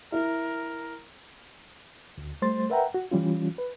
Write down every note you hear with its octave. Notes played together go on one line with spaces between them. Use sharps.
E4 A#4
D2
G3 A3 C5 C6 A6
A#4 B4 E5 F#5 G5 A#5
F#4
E3 G3 C#4 F4
B4